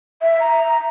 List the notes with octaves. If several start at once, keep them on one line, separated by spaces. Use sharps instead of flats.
E5
A#5